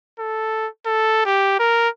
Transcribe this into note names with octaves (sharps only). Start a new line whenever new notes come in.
A4
A4
G4
A#4